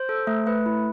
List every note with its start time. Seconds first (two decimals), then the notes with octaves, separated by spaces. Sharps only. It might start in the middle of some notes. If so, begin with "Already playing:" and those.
Already playing: C5
0.09 A4
0.27 A3
0.47 A3 B4
0.66 E4